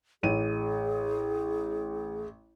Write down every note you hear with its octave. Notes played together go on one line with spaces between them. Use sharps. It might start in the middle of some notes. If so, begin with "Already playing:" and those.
A1 G#4 D#7